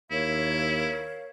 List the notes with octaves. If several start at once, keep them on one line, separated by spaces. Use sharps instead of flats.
D#2 E4 A#4 C#5 F5